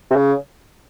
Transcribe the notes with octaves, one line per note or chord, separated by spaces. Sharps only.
C3
C#3